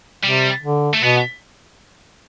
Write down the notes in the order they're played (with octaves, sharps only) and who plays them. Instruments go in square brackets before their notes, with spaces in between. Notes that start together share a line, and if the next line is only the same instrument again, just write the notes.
[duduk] C3 [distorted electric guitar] G3
[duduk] D3
[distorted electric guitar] A3
[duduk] B2 [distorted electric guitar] B3